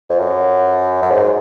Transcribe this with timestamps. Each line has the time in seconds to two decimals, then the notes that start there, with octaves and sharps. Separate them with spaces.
0.09 F2
0.19 F#2
1.02 F#2
1.11 G#2